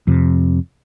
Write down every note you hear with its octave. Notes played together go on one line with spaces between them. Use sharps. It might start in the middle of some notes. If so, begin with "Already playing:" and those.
F2 C3